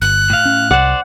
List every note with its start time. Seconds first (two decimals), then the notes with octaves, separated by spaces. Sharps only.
0.02 G1 F#6
0.30 A2 F5
0.45 C#4
0.71 C2 C5 D5 F#5